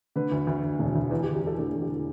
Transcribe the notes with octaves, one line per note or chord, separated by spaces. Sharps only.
D3 B4
D2
D2
D2
E1
D2
E2 B4
G4
E2
G4
E2 A4
D3 A4
E2
G4